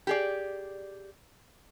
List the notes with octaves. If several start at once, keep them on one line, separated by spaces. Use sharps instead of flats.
G4 G#4 D5